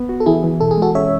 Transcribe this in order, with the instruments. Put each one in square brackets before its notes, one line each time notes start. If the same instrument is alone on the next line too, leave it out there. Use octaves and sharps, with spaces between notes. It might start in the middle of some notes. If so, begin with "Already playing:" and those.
Already playing: [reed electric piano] B3
F#4
[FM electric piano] A4
[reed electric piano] E3 [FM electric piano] E4 G#4
[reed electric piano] E3
[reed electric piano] B2 [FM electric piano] A4
[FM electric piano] G#4
[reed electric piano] G#3 [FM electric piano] F#4 A4
[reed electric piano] C#4 [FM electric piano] C#5 E5